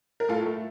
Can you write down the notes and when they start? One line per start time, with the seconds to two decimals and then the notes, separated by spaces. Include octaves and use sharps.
0.20 A#4
0.29 A2 F4 A4
0.46 A3